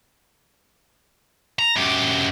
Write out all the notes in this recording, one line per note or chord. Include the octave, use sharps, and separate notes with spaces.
A#5
F#2 G4